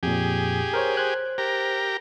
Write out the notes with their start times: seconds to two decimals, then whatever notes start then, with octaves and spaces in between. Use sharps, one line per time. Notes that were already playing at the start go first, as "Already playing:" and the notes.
0.03 F2 A#2 G4 G#4
0.74 A#4 C5 C#5
0.95 C5 F#6 G#6
1.38 G4 A#4